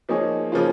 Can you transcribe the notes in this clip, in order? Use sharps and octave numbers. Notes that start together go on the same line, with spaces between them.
F3 A#3 D#4 G#4 C#5
C#3 F3 A#3 C#4 F4